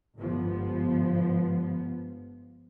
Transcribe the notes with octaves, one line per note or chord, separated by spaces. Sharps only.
G1 G#2 F3 B3